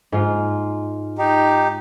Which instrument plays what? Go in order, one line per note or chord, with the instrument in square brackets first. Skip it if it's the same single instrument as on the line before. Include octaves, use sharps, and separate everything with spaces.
[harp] G#2 F4
[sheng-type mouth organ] D#4 G4